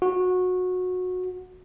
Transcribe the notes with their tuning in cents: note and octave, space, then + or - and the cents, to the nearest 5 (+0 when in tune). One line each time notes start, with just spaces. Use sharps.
F#4 -20